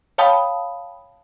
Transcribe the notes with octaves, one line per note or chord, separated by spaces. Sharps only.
C#5 F5 G5 A5 B5 D#6